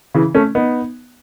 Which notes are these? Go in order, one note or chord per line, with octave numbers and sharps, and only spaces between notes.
C#3 E3
A3 C#4
B3 D#4